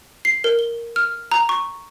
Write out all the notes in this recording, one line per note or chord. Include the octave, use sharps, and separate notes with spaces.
C7
A#4
G7
F6
A#5
C#6